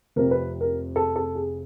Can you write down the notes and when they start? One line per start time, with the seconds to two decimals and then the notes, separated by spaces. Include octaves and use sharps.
0.16 F1 F2 C3 A#4
0.31 B4
0.61 A#4
0.96 A4
1.16 A4
1.35 G#4